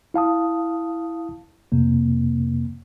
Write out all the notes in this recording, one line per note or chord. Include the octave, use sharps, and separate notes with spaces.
E4 F5 A5 D#6
F2 C3 A#3